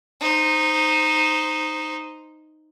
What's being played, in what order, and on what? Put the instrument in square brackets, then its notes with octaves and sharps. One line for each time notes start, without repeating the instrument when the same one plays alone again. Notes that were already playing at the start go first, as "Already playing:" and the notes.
[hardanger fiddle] D#4 C5